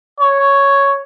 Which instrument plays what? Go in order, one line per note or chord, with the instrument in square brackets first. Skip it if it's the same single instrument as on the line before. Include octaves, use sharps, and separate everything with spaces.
[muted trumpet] C#5